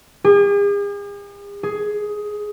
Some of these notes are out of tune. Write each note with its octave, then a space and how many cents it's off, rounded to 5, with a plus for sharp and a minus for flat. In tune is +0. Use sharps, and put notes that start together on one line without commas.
G#4 -45
G#4 +10